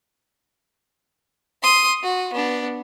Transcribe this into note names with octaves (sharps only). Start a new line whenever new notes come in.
C6 D#6
F#4
B3 D4